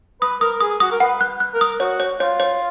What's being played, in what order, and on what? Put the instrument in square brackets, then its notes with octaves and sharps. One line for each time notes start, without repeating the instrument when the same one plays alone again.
[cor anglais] B4 [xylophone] D#6
[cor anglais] A#4 [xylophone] D#6
[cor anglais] G#4 [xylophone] D#6
[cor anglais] F#4 [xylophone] D#6
[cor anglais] A#4
[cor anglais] B4 [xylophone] F#5
[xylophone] F#6
F#6
[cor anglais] A#4
[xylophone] D#6
[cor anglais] F#4 [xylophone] C#5
[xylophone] C#5
[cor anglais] F4 [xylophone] C#5
[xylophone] C#5